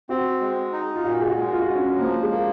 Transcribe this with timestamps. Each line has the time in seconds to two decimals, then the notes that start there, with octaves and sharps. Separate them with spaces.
0.09 C4 F#4
0.41 G#3
0.72 D#4
0.96 F4
1.04 A#2 F#4
1.21 G#4
1.29 F#4
1.37 G#3
1.52 F4
1.60 F#4
1.66 G#3 F4
1.75 C#4
1.99 F3 A#3
2.23 G#3
2.31 A#3